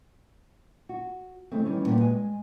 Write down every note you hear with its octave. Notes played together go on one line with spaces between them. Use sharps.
F#4
C#3 E3 G#3 A3 C4
D#3 E3 G3 C#4
G2 A#2 F#4 G4 B4
G#3 G#5